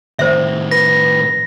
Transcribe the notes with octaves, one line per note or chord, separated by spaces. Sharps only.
A2 D#3 C5 E5
B4 A#6